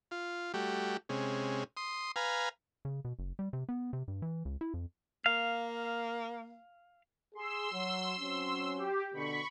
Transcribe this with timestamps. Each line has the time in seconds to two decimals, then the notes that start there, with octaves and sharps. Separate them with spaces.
0.11 F4
0.54 G3 A3 F#4 G4
1.09 C3 G#3 C#4
1.77 C6 D#6
2.16 B4 F5 G#5 A#5
2.85 C#3
3.05 B2
3.19 F#1
3.39 G3
3.53 C3
3.69 B3
3.93 C3
4.08 G2
4.22 E3
4.45 C#2
4.61 E4
4.74 F2
5.26 A#3 F5
7.35 G#4 C6 E6
7.73 F#3
8.19 F#3 C4 C#4
8.78 G4
9.14 B2 D3 B5 C#6